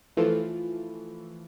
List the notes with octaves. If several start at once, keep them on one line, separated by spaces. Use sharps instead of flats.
E3 F3 A3 F4